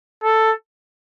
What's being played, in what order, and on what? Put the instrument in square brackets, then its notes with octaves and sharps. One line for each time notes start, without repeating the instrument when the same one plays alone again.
[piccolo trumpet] A4